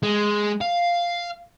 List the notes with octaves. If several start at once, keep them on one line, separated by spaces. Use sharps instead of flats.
G#3
F5